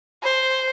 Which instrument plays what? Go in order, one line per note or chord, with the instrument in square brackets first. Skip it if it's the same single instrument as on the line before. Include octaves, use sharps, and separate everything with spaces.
[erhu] C5